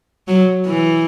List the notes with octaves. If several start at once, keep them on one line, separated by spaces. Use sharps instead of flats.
F#3
E3